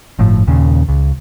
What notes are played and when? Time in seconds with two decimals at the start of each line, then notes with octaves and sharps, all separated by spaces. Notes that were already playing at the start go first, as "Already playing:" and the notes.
0.19 G1 A2 F3
0.47 D#2 A#2 C#3
0.89 C#2